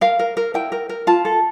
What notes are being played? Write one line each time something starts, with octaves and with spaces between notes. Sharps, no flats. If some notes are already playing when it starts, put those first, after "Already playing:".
A#4 F5
A#4
A#4
E4 G5
A#4
A#4
F4 A5
A4